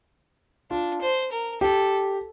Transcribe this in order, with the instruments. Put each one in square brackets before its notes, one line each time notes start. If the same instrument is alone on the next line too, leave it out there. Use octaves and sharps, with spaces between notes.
[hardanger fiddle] D4 [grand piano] F4
[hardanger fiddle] C5
A#4
[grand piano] G4 [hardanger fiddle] A4